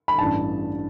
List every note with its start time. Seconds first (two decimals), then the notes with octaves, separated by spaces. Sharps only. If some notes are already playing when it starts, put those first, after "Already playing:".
0.08 B5
0.19 A1 G2 G3 A5